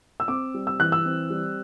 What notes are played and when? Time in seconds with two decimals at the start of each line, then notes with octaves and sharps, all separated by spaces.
0.20 E6
0.28 C4 D6
0.54 G3
0.67 E6
0.79 E3 F#6
0.92 E6
1.05 C4
1.30 G3